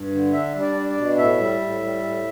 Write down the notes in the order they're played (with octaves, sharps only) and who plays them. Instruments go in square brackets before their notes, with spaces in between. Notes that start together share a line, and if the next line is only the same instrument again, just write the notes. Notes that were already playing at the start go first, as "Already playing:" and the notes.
Already playing: [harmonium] G2
D3
D4 E5
G3
D5
D4
D5
B2
A2 E5
G3
A2
G3
A2